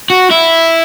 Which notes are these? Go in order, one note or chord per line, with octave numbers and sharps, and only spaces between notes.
F#4
E4